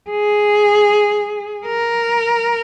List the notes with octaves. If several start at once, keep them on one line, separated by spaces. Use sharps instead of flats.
G#4
A#4